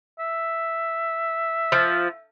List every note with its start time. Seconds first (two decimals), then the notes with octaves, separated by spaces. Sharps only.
0.19 E5
1.72 F3